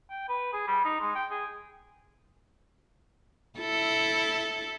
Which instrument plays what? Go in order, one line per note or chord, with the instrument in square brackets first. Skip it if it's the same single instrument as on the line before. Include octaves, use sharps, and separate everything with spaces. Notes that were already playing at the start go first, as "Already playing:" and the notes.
[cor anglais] G5
B4
G#4
G3
D#4
G#3
G5
G#4
[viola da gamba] E4 A4